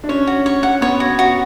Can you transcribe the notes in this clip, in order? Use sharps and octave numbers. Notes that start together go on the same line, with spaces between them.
D4
C#4 C#5
F#4
C#5
F#5
B3 C#5
F#4
F#4